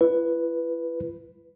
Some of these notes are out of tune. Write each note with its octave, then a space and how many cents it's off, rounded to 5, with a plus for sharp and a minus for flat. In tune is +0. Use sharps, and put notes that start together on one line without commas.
E4 +40 B4 +0